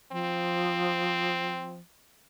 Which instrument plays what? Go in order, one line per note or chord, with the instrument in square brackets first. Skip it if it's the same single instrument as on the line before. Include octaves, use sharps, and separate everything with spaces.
[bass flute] F3 [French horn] C4